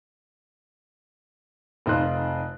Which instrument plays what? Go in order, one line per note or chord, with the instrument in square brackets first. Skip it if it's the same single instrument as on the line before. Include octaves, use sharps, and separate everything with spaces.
[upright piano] F1 C4 D#4 F4 C6 F#6